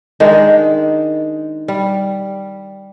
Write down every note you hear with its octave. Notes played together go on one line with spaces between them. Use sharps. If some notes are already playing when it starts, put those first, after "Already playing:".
D#3 G#3 D4
G3